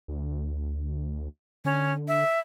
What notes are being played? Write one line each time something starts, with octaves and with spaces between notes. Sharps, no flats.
D2
D3 C#4
E5